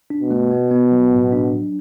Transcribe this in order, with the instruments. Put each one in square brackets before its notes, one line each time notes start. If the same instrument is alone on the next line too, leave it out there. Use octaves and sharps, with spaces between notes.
[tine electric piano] D4
[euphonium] B2
[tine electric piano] A3
B3
B3
F#3
A2
D4
F#3